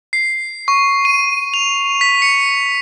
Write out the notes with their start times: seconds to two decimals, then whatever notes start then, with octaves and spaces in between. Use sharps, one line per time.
0.13 C7
0.68 C#6
1.05 D#7
1.54 F7
2.01 B6
2.22 C#7